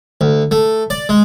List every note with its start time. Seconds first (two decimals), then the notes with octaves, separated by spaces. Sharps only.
0.21 D2
0.51 A3
0.90 D5
1.09 G#3